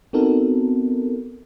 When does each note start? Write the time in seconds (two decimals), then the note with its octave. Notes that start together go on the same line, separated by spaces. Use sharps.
0.13 B3 C4 D#4 F#4 A4 A#4